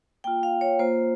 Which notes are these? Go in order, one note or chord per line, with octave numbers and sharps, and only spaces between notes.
A#3 F4 G5
F5
C#5
A#3 F4 C5